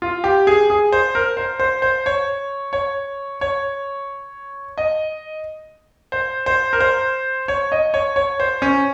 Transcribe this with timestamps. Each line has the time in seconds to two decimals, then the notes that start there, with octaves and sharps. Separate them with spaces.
0.02 F4
0.24 G4
0.47 G#4
0.70 G#4
0.92 C5
1.15 A#4
1.37 C5
1.60 C5
1.82 C5
2.06 C#5
2.73 C#5
3.41 C#5
4.78 D#5
6.12 C5
6.46 C5
6.73 A#4
6.80 C5
7.48 C#5
7.72 D#5
7.94 C#5
8.16 C#5
8.40 C5
8.62 C#4